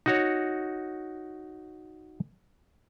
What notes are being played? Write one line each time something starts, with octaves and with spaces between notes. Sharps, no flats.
D#4 F#4 C#5